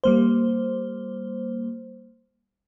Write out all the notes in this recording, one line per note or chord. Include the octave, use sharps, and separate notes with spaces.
G3 A#3 C5